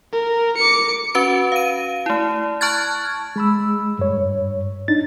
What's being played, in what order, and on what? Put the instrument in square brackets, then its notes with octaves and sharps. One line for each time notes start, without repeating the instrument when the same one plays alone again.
[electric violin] A#4
D6 C#7
[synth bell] C#4 F#4 B4 D7
F5 D#7
A3 E4
A5 C#6 F6 F#6 G#6 A6
[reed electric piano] G#3 B5 E6
G2 C#5
D4 D#4 A6